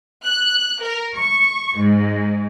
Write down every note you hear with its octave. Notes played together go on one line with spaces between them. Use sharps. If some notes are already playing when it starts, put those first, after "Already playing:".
F#6
A#4
C#6
G#2